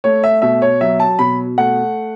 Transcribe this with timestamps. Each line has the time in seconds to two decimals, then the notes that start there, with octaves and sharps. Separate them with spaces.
0.04 A3 C#5
0.24 E5
0.42 B2 E5
0.62 C#5
0.81 F#3 E5
1.00 A5
1.19 B2 B5
1.58 A3 F#5